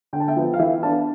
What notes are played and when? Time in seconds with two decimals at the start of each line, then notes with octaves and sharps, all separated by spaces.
0.13 D3 G5
0.20 A5
0.28 E5 G5
0.36 F3 B3
0.54 F5
0.59 E3 E5 G5
0.83 B3 D4 F5 A5